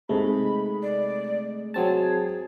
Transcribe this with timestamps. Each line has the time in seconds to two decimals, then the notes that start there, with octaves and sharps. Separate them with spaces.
0.09 C3 G#3 A3 D#4 B5
0.82 D5
1.74 F#3 C4 G#4 A5